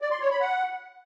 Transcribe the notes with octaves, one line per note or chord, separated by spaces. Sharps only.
D5
C6
C#5
B5
F#5